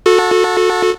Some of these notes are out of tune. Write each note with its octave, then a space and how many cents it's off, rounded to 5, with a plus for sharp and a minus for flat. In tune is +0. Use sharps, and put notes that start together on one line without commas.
F#4 -30 A4 +0